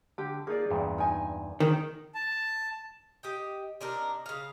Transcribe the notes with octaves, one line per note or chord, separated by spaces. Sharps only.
D3 G4
A#3 D#4 F4 G#4 D5
E2 G2 A#2
D#4 G#5
D#3 G#4
A5
G4 D#5 G5
C3 D4 D#4 A#4
C#3 F5